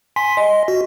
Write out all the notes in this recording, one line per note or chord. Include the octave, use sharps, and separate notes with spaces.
G#5 C6 B6
D#5
F#4